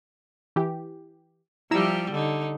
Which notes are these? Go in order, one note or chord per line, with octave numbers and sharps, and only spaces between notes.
E3 G4
F3 G3 E4 G4 A#5 E6
D3 D#4